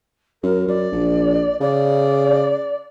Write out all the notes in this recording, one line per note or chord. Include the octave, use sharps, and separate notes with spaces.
F#2 A#4
F#2 D5
A#1
C#3 D5